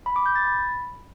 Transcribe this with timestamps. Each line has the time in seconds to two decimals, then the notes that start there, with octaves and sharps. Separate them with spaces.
0.06 B5
0.16 D6
0.26 G6
0.36 A6
0.45 B5